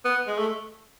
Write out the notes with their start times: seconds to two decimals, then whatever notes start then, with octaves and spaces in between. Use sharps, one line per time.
0.05 B3
0.28 G#3
0.39 A3